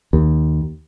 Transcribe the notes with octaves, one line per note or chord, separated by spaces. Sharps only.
D#2